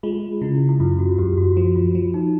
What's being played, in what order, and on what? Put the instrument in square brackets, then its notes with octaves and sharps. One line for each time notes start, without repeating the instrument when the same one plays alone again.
[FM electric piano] G#3 [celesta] F4
[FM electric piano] C#3 [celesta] E4
[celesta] E4
[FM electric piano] F#2 [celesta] F4
[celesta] F#4
[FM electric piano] F#2 [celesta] G4
[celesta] F#4
[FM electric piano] F3 [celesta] F#4
[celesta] F4
[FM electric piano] F3
[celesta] D#4